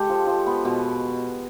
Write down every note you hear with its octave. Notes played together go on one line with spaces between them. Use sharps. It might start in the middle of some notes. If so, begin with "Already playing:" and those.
Already playing: G#3 G4 A4
F3
F3
B3
B2